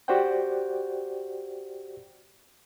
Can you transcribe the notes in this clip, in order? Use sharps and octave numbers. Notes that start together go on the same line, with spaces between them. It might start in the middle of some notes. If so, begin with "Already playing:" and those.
F#4 G4 C5 D5 F#5 G5